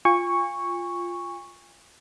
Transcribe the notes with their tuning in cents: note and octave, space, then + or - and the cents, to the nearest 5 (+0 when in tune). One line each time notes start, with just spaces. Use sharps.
F4 +0 G#5 -35 C#6 +0